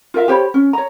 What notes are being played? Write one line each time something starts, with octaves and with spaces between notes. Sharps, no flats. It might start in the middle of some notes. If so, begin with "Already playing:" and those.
F4 A#4 E5 F5
G4 C5 C#5 B5
C#4
C#5 A#5